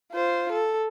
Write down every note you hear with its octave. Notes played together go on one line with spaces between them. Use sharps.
F4 C5
A4